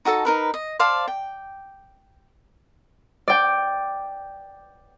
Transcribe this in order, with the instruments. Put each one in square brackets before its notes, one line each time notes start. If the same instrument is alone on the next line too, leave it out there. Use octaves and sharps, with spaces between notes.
[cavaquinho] D#4 F#4 A4 A5
D#4 A#4 B4
D#5
C5 D5 F5 A5
G5
[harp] D5 G5